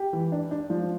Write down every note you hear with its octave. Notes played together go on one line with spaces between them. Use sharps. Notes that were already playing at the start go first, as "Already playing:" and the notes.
Already playing: G4
E3
D4
D4
F3